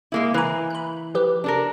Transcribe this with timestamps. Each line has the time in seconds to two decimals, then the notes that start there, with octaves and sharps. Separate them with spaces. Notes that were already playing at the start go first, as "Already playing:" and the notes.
0.12 G#3 A#3 E4
0.34 E3 B4 G#5 A#5
0.70 B5 F#6
1.14 F3 G4 B4
1.44 D4 A4 A#4